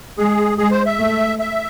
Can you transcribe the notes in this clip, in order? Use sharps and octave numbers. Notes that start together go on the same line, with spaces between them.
G#3 G#4
G#3 G#4
C5
E5
A3
E5